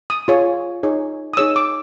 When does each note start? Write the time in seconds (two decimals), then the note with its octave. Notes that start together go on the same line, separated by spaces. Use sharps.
0.10 D#6
0.28 F4 G#4 C#5
0.83 D#4 G#4 C#5
1.34 D#6
1.37 D#4 G#4 C#5 E6
1.56 D6